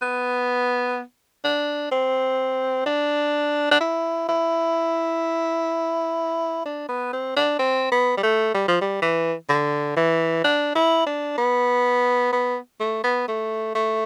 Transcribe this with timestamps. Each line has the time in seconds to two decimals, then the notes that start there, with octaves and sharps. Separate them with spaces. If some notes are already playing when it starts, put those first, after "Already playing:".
0.02 B3
1.44 D4
1.91 C4
2.86 D4
3.71 D4
3.80 E4
4.29 E4
6.66 D4
6.89 B3
7.13 C4
7.36 D4
7.59 C4
7.91 B3
8.17 G3
8.23 A3
8.54 G3
8.68 F3
8.81 G3
9.02 E3
9.49 D3
9.96 E3
10.44 D4
10.75 E4
11.06 D4
11.38 B3
12.32 B3
12.80 A3
13.04 B3
13.28 A3
13.75 A3